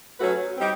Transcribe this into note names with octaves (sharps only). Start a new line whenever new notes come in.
F#3 A3 C#4 F#4 B4
G3 C4 D#4 G4